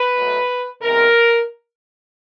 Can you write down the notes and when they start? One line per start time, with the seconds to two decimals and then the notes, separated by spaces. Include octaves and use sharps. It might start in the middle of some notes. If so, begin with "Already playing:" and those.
Already playing: B4
0.16 B2 F#3 A3
0.82 C3 D#3 G#3 B3 A#4